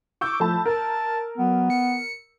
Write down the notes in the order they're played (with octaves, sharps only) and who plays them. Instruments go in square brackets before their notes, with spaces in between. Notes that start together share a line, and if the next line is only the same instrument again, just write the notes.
[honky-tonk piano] C#6 E6 G6 [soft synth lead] D6
[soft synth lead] F3 [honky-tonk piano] A3 A5 B5
[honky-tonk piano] A#4 [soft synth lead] A5
[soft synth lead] F#3 [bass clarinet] B3
[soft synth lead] C#7